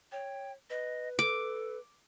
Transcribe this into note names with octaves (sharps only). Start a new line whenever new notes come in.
C#5 G5
B4 D#5
A4 D6